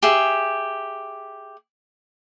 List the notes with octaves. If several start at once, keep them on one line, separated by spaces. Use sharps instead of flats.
G4 G#4 E5